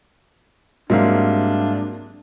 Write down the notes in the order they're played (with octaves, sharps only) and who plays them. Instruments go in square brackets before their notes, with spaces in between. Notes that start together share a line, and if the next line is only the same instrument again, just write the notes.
[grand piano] G#2 [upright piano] F#3 A#3 C4 [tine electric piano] G3 E5 F5 [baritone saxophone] D4